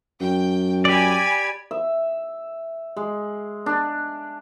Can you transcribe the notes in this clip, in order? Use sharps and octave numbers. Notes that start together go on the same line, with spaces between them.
F#2 G5
G4 D5 G#5 B5 G#6
E5
G#3
D4